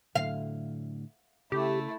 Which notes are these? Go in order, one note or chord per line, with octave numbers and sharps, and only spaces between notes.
A2 D3 F#3 F5
C#3 A3 E4 G4